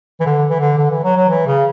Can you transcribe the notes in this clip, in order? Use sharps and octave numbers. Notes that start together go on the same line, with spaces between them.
E3
D3
E3
D3
D3
E3
F#3
F#3
E3
C#3